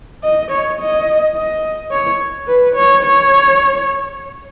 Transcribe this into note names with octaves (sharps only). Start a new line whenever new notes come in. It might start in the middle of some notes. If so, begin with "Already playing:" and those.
D#5
C#5
D#5
D#5
C#5
B4
C#5
C#5